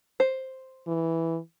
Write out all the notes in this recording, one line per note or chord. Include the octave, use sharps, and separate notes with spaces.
C5
E3